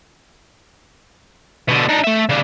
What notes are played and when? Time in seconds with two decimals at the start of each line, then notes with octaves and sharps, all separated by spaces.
1.69 B2 D3
1.89 D4 D#4
2.04 A3 E5
2.29 C#3 D4